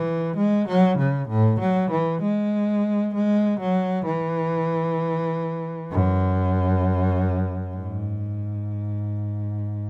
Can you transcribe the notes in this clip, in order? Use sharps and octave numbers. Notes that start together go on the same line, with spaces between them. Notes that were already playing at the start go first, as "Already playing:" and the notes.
Already playing: E3
G#3
F#3
C#3
A2
F#3
E3
G#3
G#3
F#3
E3
F#2
G#2